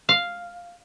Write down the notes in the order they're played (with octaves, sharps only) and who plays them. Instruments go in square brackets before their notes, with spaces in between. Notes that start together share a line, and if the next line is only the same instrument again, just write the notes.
[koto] F5